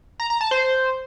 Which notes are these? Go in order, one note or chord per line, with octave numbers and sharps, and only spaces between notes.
A#5
A#5
A5
C5